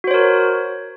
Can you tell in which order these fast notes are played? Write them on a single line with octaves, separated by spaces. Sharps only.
F#4 C5 C#5 A#4